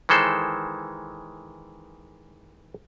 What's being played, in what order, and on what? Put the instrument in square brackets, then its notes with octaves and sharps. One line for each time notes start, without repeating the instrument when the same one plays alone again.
[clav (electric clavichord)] D#3 E3 G#3 A4 C5